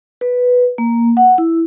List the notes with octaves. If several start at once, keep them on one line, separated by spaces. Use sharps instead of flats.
B4
A#3
F#5
E4